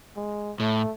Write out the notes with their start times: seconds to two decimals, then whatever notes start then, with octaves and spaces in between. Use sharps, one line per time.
0.16 G#3
0.60 A2 A3